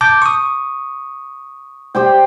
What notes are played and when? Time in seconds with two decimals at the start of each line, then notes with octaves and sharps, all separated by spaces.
0.01 A5 D6 G6
0.22 C#6 D#6
1.95 G4 C5 G5